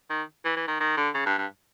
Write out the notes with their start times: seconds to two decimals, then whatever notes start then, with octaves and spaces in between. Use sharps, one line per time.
0.10 D#3
0.45 E3
0.56 E3
0.68 D#3
0.80 D#3
0.97 D3
1.14 C#3
1.26 G2
1.38 G2